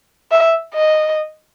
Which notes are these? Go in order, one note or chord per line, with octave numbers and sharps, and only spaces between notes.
E5
D#5